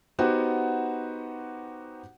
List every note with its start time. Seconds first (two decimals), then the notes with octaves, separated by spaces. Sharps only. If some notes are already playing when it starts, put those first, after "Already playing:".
0.19 B3 D#4 F#4 G4 C5 F#5